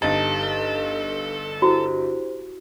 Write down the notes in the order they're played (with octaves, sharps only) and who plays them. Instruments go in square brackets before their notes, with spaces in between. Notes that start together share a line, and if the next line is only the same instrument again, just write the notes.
[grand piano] G1 D#4 A6 [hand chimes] G4 D#5 [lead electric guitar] A4 [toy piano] A5
[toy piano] E4 F#4 [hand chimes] G4 C5